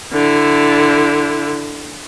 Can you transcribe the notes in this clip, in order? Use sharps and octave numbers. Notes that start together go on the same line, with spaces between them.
D3 E4